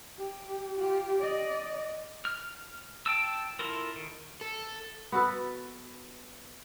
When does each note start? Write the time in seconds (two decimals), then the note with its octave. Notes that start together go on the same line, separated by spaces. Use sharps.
0.19 G4
0.77 F4 G4
1.19 D5 D#5
2.25 F6
3.06 G5 A5 E6
3.59 E4 F4 A4 A#4
3.96 D#3
4.41 A4
5.12 B3 F#4 A4 B4